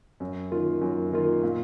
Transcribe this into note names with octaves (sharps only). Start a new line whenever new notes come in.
F#2
D#3 A#3 F4
F#2
D#3 A#3 F4
A#2